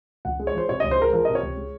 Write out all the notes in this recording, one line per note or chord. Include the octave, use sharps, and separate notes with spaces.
C#2 F#5
G#3
C#5
F3 C5
C3 C#5
C#2 D#5
C5
G#3 A#4
F3 A#4
C3 D#5
C#5
C#2
G#3